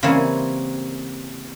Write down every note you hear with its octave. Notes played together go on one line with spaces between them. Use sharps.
C#3 E3 G3 A#3 C4